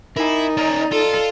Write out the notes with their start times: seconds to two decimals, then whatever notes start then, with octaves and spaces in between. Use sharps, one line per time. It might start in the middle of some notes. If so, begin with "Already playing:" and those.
0.17 D#4 E4 A#4 G#5
0.57 A#3 C#4 D5 D#5 A#5
0.91 F4 A4